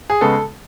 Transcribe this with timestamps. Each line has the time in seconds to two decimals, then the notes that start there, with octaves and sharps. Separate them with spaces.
0.10 G#4
0.21 C#3 G#3 B3 A4